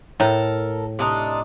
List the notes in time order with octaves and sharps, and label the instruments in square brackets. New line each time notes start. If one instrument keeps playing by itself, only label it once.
[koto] A2 [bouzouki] A4 A#4
[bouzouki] C3 D4 D#4